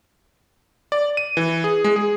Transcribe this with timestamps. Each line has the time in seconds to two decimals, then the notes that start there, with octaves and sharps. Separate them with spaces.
0.92 D5
1.17 D#7
1.37 E3
1.64 G#4
1.84 G#3
1.96 G#4